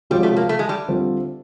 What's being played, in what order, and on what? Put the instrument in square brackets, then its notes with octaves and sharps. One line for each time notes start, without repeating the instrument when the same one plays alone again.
[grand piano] C3 F3 G#3 C#4 F#4 [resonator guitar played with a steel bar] G3
[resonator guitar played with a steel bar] A3
A#3
A3
G#3
G3
[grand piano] D3 G3 C4 F4